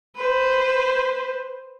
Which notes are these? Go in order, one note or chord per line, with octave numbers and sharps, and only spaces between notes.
B4 C5